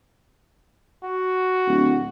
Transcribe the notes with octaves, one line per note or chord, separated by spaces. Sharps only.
F#4
D1